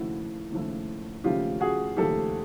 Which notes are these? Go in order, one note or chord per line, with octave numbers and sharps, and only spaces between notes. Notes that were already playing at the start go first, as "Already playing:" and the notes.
Already playing: D#2 C#3 F3 A3 E4 F#4
D#2 C#3 F3 A3
D#2 C#3 F3 A3 F4 G4
F#4 G#4
D#2 C#3 F3 A3 G4 A4